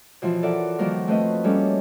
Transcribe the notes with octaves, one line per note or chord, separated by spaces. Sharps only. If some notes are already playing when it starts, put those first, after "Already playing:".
B2 E3 F3 F4
A4 A#4 D5 E5 F#5
D#3 F3 G3 A#3 F#4 A#4
A3 C4 B4 D#5
G3 A#3 C#4 A4